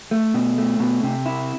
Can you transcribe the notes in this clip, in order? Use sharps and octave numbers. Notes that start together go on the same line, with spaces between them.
A3
B2
A3
B2
C3
E4